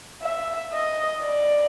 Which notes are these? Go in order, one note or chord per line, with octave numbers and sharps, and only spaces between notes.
E5
D#5
D5